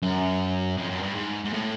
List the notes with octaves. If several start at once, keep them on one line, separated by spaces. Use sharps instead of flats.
F#2
F2
F#2
G2
G#2
G#2
A2